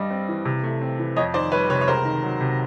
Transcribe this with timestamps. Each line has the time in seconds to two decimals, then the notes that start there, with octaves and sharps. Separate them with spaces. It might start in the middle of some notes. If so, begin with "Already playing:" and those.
Already playing: G2 G3 D#5
0.11 C4
0.29 E3
0.45 C3
0.64 A3
0.82 C4
0.99 E3
1.16 F2 C#5 D#5
1.34 D#3 C5 D5
1.52 G3 B4 C#5
1.69 C3 B4 C#5
1.81 C#5
1.88 C#2 A#4 C5
2.05 D#3
2.23 F#3
2.41 C3